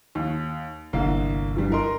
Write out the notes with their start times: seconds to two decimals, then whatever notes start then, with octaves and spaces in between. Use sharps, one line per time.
0.15 D#2
0.93 G1 C2 D3 A#3
1.55 G2 E3 G3
1.72 A#4 D#5 C6